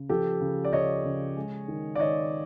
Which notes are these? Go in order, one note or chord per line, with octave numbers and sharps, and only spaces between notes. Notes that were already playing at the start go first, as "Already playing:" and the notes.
Already playing: C#3
F3 G4 A4
C#3
D5
C#3 C#5 D#5
C#3
G#3
D#3
D5
D#3 C#5 D#5